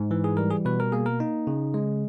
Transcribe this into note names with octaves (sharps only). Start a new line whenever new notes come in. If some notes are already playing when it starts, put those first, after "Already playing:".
Already playing: G#2
E3
G#4
G3 A#4
G#4
B2 B4
A#4
A#3 G#4
A#4
D#4
C#3
G#3